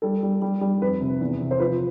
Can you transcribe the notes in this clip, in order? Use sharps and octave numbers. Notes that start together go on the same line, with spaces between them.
G3 A4
G3
G3
G3
F2 B4
C3
E2
C3
C5
F3 B4